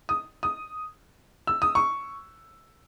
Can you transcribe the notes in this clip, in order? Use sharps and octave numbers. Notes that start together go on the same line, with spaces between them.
D#6
D#6
E6
D#6
C#6